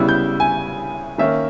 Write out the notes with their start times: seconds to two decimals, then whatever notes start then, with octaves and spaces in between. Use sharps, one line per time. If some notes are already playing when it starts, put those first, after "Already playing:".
Already playing: C#3 G3 B3 E4 E6
0.09 G6
0.40 G#5
1.18 D#3 A#3 C#4 E5